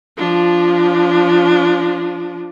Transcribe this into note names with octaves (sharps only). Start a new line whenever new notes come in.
F3 D4